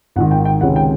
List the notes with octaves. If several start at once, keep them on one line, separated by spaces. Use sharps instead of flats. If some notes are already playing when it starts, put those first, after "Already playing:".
G#1 G#2 D#3 F#5
G5
G5
C#2 C3 D#3 G#3 C#4 F#5
G5